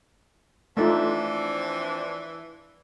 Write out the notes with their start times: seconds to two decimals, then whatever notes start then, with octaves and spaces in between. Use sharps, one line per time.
0.77 E3 F3 A3 C4 D4 D#4 F4